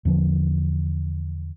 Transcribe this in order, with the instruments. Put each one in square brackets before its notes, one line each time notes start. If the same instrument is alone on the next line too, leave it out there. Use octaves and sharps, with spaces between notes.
[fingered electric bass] E2 D3 F3